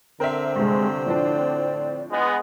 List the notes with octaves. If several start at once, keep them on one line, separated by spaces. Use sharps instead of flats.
D3 C4 A#4 E5
G2 C3 G#3
A2 F3 D4 D5
G#3 B3